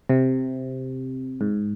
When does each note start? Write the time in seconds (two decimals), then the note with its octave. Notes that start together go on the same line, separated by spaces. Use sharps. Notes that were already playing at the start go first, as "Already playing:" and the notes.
0.09 C3
1.41 G#2